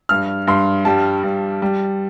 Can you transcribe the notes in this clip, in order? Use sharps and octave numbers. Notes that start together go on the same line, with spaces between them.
G2 F6
G2 C6
G3 A5
G2
G3